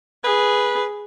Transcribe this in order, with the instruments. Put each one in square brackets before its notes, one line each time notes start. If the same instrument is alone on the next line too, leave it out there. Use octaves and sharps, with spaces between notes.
[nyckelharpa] G#4 [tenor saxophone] B4